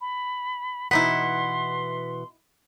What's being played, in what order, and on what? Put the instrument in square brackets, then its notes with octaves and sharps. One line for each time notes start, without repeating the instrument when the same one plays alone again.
[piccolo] B5
[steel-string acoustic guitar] B2 E3 F#5 [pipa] B3 D#4 E4 [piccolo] C6 [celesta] B6